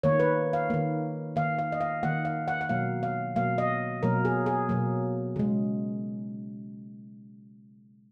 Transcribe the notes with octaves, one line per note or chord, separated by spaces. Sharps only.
D#3 A#3 C#5
B4
F5
D#3 A#3
D#3 A#3 F5
F5
D#5
F5
D#3 A#3 F#5
F5
F#5
F#5
B2 F#3 A#3 F5
F5
B2 F#3 A#3 F5
D#5
B2 F#3 A#3 A#4
G#4
G#4
B2 F#3 A#3
C#3 G#3